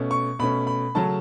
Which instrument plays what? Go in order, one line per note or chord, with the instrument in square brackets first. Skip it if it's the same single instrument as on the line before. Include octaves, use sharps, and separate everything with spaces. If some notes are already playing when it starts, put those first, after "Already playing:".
Already playing: [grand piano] B2 A3 C#4
C#6
B2 A3 C#4 B5
B5
C#3 F#3 A3 C#4 A5